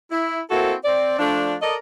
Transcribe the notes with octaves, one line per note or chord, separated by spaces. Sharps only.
E4
A#3 C4 E4 F#4 A4
C4 D5
F3 A3 D4
A4 A#4 D5 D#5